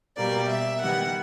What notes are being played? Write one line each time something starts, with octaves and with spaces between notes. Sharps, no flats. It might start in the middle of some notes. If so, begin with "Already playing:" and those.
B2 G3 A#3 D5
E5
D#3 G3 B3 F#5